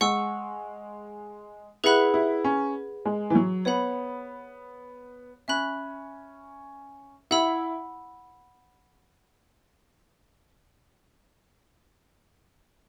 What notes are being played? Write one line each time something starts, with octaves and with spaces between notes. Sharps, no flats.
G#3 F#5 C#6 E6
E4 G#4 B4 F#5 B5 F#6
E4
C#4
G#3
E3
F#3
B3 C#5 F#5 B5
C#4 E5 B5 F#6
E4 F#5 B5 E6